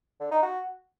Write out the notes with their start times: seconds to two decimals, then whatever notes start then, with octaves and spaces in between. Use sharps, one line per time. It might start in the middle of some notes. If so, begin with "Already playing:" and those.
0.20 D3
0.31 D#4
0.42 F#4